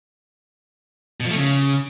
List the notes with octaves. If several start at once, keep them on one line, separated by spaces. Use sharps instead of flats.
B2
F3
A3
C#3